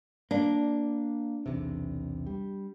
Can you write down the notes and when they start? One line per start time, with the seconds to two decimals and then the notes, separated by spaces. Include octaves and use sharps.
0.31 A#3 D4
1.46 B1 E2 C3
2.27 G3